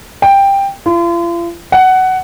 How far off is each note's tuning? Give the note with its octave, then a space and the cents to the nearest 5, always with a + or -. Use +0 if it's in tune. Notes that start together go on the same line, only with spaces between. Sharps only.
G5 +10
F4 -40
F#5 +15